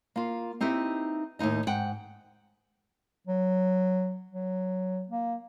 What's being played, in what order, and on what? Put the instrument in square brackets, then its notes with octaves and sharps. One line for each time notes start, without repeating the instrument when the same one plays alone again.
[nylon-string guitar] A#3 F4
C4 D#4 E4 G4 B4
D#2 A2 E3 D#4 D#5
G#2 F#5 G5
[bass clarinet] F#3
F#3
A#3